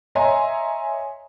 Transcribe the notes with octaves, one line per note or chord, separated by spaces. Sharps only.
C#5 D#5 E5 G#5 A#5 C6